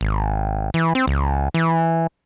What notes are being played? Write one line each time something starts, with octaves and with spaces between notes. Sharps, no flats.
G#1
E3
C4
C#2
E3